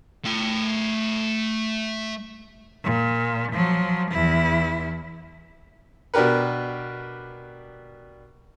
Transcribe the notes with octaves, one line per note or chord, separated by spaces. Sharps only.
A3 G5
A#2
F3 F#3
E2 E4
B2 D4 G4 A#4 B4